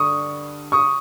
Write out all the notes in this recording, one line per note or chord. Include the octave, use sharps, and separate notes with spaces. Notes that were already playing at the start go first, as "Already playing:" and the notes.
Already playing: G2 D3 C#6 D#6
C#6 D#6